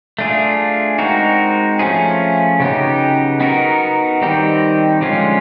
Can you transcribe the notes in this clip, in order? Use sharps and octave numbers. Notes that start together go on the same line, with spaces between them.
A3 D4 F4 G#4
G#3 C4 D#4 F#4 A#4
F3 A3 C#4 F4 G#4
C#3 F#3 B3 D#4 G4
B3 D#4 F#4 A#4
D#3 G3 C4 D#4 G4
D3 F3 G#3 C#4 F4